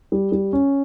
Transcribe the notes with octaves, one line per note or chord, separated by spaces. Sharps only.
G3
G3
C#4